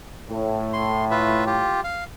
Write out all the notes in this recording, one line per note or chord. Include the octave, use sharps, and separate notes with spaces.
A2
C6
F4 B4 E5
F4 G4
F5